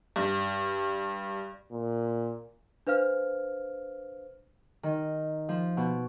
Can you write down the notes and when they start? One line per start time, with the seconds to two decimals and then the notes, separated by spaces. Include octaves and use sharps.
0.16 G2
1.72 A#2
2.87 D4 B4 C5 F5 F6
4.83 D#3
5.49 F3
5.77 B2